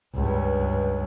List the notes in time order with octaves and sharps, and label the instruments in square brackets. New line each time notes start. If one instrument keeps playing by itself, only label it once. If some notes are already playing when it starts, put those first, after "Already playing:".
[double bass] C#2 G2